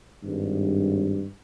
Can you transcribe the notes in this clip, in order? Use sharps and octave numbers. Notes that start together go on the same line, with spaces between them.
G#1 G2